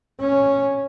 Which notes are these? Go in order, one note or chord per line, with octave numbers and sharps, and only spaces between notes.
C#4